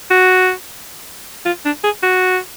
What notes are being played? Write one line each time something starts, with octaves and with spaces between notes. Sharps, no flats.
F#4
F4
D4
G#4
F#4